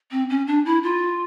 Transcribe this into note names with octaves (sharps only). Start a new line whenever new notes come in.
C4
C#4
D4
E4
F4